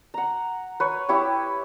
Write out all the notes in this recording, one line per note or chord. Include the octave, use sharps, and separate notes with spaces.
F#5 A#5
B4 C#5
E4 G4 C#5